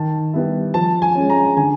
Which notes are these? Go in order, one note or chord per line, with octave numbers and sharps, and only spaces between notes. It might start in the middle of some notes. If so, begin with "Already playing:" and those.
Already playing: D#3 A5
G3 B3 E4
F3 A5
G#5
G#3 C#4
A#5
D3 G#5